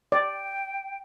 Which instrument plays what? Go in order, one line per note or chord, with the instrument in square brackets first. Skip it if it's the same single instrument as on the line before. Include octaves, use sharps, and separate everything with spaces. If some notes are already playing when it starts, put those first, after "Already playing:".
[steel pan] D5 [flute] G5